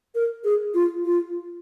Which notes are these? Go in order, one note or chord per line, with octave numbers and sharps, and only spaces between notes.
A#4
G#4
F4
F4